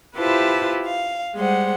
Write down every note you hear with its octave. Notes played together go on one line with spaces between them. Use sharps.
E4 F4 G4 B4 C5 A5
F5
G3 G#3 C5 F#5